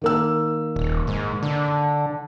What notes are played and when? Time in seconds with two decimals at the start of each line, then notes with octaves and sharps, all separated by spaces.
0.02 D#3 A#3 E6
0.76 D#1
1.07 G#2
1.43 D3